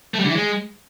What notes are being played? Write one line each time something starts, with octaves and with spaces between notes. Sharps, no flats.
A3
G3
D3
E3
G#3